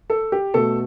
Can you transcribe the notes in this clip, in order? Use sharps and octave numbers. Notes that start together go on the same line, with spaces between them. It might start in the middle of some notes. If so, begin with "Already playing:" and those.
A4
G4
B2 A3 A4